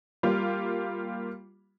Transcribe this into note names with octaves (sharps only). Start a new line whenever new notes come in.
G3 A#3 F4